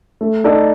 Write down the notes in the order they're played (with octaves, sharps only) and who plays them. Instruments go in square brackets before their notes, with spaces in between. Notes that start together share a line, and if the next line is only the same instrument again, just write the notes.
[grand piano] A3
D#4 A4 D5